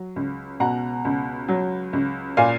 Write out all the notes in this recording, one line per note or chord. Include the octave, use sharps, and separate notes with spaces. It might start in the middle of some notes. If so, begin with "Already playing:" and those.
Already playing: F#3
C#2
B2 F#5 A#5
C#2
F#3
C#2
A#2 F5 G#5